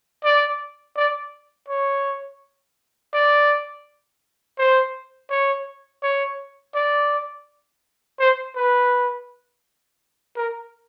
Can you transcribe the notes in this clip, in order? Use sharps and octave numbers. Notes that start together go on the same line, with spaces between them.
D5
D5
C#5
D5
C5
C#5
C#5
D5
C5
B4
A#4